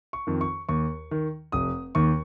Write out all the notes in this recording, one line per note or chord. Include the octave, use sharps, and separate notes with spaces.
C#6
F2 D#3
C#6
D#2 C#6
D#3
F1 D#6
D#2 D#3 C#6